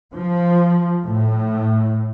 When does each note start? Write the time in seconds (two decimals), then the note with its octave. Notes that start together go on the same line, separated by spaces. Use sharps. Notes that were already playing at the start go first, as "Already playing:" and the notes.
0.14 F3
1.05 A2